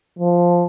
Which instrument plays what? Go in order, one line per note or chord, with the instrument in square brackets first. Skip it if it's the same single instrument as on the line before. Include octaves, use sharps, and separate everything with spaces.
[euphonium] F3